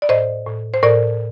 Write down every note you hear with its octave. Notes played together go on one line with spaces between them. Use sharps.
D5
A2 C5 D#5
A2
C5
A2 A#4 D5